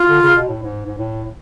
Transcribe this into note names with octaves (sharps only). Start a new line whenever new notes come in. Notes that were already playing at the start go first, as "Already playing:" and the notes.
Already playing: F4
D3
C#3
B2
A2
G#2
G#2
A2